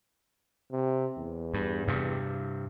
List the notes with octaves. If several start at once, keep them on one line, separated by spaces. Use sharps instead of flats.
C3
E2
G2
G2 C3